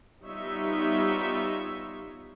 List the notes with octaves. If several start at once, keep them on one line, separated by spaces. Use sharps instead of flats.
G3 B3 D#4 F4 C#5 E5